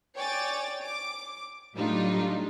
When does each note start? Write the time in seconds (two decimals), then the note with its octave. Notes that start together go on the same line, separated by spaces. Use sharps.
0.16 C#5 D5 G5 G#5 D6 A6
0.83 D6
1.75 A2 F#3 G3 D4 D#4 F4